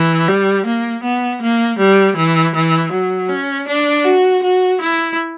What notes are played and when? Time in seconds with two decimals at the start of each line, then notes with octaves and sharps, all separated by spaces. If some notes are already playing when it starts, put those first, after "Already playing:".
Already playing: E3
0.28 G3
0.65 A#3
1.03 B3
1.41 A#3
1.79 G3
2.16 E3
2.55 E3
2.92 F#3
3.29 C#4
3.68 D4
4.05 F#4
4.43 F#4
4.81 E4